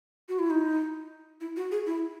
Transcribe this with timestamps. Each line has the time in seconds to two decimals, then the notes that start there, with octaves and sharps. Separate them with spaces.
0.29 F#4
0.39 E4
0.50 D#4
1.41 E4
1.56 F#4
1.71 G#4
1.87 E4